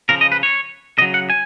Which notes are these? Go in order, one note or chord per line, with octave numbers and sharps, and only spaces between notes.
C#3 F3 A#4
D#5
B4
C#5
C#3 F#3 D#5
F#5
G#5